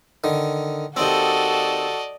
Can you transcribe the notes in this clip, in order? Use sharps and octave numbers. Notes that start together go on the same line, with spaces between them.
D3 D#3
D#2 C4 F#4 A4 D5 D#5